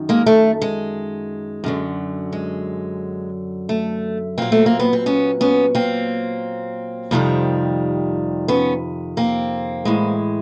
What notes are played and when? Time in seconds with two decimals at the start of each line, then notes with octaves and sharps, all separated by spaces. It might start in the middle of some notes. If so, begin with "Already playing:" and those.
Already playing: F#2 D#3
0.09 G#3 A#3
0.26 A3
0.62 G#3
1.64 F#2 D3 F#3
2.33 G#3
3.69 A3
4.38 A#2 F#3 A#3 C4
4.52 A3
4.66 A#3
4.79 B3
4.93 C4
5.06 B3 C#4
5.41 B3 C#4
5.75 A#3 C4
7.11 F2 C3 D#3 G3
8.48 B3 C#4
9.17 A#3 C4
9.85 A2 E3 G#3